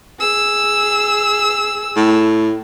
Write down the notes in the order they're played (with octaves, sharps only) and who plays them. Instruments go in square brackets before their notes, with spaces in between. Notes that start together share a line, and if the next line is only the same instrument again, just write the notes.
[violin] G#4 E6
[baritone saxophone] A2